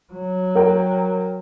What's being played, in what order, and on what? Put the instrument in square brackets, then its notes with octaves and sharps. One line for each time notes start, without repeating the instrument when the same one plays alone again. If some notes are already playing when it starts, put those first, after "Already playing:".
[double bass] F#3
[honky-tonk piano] A#4 G5